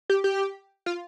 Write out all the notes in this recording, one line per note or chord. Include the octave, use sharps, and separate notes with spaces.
G4
G4
F4